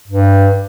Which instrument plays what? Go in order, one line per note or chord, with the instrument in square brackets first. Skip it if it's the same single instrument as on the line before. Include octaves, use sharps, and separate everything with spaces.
[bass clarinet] G2